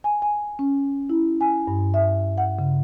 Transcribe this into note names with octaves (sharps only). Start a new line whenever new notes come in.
G#5
G#5
C#4
E4
G#5
G2
E5
F#5
C#3